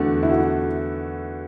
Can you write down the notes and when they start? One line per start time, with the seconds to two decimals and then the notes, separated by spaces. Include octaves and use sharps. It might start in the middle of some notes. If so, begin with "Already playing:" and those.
Already playing: E2 D3 A3 F#4
0.23 E4
0.30 F#4
0.38 E4